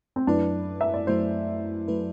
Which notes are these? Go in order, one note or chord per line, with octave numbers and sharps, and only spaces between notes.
C4
F#2 F#3 A3 D4 E4 B4
E5
D5
F#2 F#3 A3 E4 B4 C5
F#3 A3 E4 B4